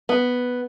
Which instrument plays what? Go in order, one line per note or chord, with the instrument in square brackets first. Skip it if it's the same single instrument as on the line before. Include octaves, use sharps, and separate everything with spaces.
[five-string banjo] B3